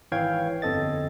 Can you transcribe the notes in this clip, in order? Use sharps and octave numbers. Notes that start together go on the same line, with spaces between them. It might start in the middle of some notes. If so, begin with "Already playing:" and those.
G#1 E3 C#5 F5 G5 G#6
G1 F2 C4 A4 D#5 A6